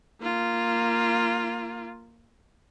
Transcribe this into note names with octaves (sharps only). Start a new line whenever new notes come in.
A#3 F4